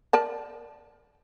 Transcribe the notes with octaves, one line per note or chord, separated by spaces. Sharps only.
A#4 D5 A5